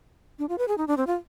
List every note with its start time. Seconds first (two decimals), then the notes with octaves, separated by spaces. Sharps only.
0.39 D4
0.49 F4
0.58 B4
0.68 G#4
0.78 D#4
0.88 D4
0.97 C4
1.07 F4